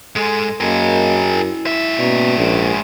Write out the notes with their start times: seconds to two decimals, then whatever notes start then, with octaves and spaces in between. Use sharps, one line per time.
0.16 G#2 G#3 A4
0.60 F#2 A#3 G#4 A#4 D#5 F5
1.31 E4
1.67 G#2 E5
1.99 B2 A#3 C#4 D5
2.38 A#1